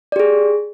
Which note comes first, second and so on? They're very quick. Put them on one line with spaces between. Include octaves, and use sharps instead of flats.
D5 G4 G#4